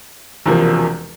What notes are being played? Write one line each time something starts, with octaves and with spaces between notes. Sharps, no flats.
E1 E2 C3 F3 A#3